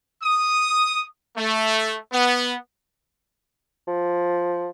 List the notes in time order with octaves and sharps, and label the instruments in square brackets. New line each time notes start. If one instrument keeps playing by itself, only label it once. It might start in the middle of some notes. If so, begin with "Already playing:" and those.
[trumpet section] D#6
A3
B3
[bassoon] F3